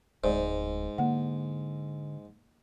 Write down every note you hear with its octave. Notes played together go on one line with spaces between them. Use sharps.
D1 G#2 G#3 C5 D5
D3 A#3 F#5